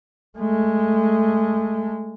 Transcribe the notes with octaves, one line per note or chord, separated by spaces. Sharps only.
G#3 A3